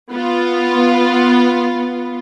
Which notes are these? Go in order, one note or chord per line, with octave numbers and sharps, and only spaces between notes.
B3 F4